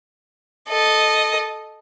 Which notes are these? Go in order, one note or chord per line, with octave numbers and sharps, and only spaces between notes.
A4 D#5